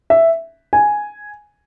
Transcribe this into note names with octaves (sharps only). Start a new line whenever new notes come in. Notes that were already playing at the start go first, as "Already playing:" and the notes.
E5
G#5